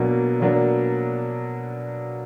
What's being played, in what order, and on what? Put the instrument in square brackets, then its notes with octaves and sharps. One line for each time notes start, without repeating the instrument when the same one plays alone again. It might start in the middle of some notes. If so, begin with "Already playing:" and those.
Already playing: [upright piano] B2 F#3 A#3 D4
B2 F#3 A#3 D4